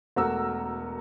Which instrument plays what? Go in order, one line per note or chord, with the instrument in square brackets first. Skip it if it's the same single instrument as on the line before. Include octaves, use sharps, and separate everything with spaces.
[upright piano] E1 A3 F#4 A#4 A#5 E6